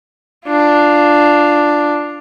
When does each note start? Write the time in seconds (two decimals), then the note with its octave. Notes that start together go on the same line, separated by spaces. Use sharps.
0.46 D4 F4